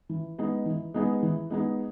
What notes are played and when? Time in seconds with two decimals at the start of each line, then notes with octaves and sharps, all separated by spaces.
0.09 E3
0.38 G#3 B3 D#4 G#4
0.66 E3
0.94 G#3 B3 D#4 G#4
1.23 E3
1.50 G#3 B3 D#4 G#4